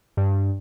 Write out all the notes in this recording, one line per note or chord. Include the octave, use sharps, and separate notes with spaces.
G2